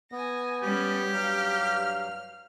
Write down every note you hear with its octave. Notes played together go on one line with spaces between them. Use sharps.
B3 G#5 A#6
G3 C#4 G4
G2 F#3 F5 F6